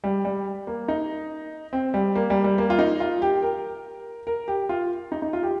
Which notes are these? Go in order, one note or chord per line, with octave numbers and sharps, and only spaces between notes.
G3
G3
A#3
D#4
C4
G3
A#3
G3
G3
A#3
F4
D#4
F4
G4
A#4
A#4
G4
F4
D#4
D#4
F4
G4